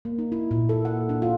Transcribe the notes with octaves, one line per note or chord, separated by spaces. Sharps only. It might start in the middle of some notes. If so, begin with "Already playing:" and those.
A#3
D#4
E4
A#2
A4
F#5
D4
F4